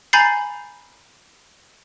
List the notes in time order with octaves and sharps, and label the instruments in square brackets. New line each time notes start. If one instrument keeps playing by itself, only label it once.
[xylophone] G#5 A#5 B5 G6 A6 C7